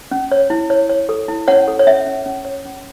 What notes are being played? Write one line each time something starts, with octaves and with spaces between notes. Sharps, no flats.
C#4
C#5
E4
C#5
C#5
A4
E4
C#4 C#5 F#5
A4
C#5
C#4 E5
C#4
C#4
C#5
C#4